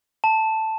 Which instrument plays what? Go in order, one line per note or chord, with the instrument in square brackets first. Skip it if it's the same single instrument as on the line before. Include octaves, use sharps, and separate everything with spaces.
[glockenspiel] A5